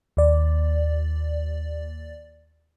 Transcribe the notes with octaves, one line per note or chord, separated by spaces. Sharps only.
D#2 D5